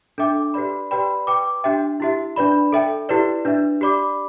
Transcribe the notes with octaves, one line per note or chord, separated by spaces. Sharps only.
D4 A4 E5 G5 D6
G4 B4 D5 B5
G4 B4 D5 G5 B5
B4 G5 D6
D4 G4 E5 G5
E4 G4 E5
D4 B4 D5 B5
A4 E5 G5
E4 G4 B4 D5
D4 B4 E5
G4 D5 B5 D6